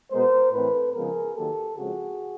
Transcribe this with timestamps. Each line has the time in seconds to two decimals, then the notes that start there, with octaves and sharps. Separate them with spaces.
0.12 B2 G#3 B3 A#4 C5
0.52 A2 E3 A3 C4 A4 B4
0.94 C#3 F3 G#3 B3 G#4 A#4
1.35 D#3 F#3 A#3 G4 A4
1.76 C#3 F3 G#3 C4 F#4 G#4